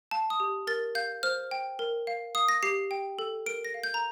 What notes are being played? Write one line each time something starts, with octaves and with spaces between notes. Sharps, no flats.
F5 A5
D#6
G4
A#4 A6
F5 G6
C5 F6
G5
A#4
F5
F5 D#6
A#6
G4 C7
G5
A4
A#4 D7
A#6
F5
G6
A#5